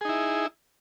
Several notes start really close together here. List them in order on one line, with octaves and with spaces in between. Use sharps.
G#4 D#4 E4